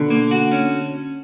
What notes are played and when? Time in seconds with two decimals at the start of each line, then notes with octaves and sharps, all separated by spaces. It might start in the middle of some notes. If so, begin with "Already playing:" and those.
Already playing: B2 D3
0.10 A#3
0.31 F#4
0.52 C#4